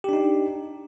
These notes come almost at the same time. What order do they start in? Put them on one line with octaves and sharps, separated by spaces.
G4 D4 D#4